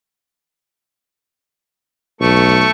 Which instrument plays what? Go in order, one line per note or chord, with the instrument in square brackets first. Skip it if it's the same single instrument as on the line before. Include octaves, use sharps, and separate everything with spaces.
[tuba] B1 [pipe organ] A3 C#6